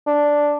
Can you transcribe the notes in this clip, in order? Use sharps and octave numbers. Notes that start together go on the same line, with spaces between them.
D4